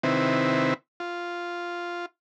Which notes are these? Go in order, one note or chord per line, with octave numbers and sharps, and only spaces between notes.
C3 D#3 C4 E4 B4
F4